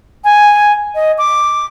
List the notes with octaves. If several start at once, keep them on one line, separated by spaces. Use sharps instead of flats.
G#5
D#5
D6